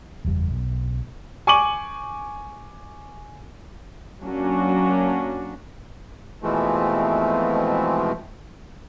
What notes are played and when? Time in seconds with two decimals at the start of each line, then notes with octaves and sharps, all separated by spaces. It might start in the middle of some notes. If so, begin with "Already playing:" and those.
0.25 F#1 E2 G3
0.51 B1
1.47 G#5 C#6 D6 D#7 F#7
4.23 F#3 A#3 C#4 D4 F#4
6.43 B2 E3 F3 G#3 A3 C4